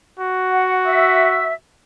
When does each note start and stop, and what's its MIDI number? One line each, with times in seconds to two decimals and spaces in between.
0.20 1.55 66
0.52 0.73 78
0.86 1.52 76
0.86 1.52 88